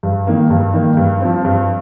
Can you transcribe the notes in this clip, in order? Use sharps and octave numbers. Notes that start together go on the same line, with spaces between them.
G2
D#3 A#3
G2
D#3 A#3
G2
F3 C4
G2